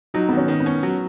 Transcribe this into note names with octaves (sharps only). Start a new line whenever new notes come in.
F#3 D#4
D#3 B3
C#4
D#3
B3
C#4
F#3